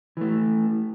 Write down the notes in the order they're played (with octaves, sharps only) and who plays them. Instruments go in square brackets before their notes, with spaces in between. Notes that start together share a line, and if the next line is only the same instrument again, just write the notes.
[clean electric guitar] E3 A3